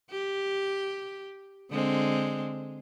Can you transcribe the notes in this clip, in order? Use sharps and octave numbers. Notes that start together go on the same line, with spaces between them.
G4
D3 G#3 C4